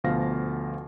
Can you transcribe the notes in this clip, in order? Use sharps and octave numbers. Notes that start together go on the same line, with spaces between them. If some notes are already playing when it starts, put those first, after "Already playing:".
D2 B2 F3 F5 A#6